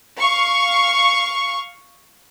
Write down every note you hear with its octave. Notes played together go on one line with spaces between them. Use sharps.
F5 C#6